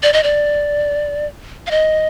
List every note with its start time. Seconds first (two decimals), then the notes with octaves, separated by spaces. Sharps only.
0.03 D5
0.13 D#5
0.23 D5
1.67 F5
1.71 D#5